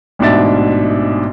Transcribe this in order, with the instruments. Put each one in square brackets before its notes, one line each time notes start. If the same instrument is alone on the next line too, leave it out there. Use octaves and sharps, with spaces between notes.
[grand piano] A1 G#2 B2 D4 E5 A6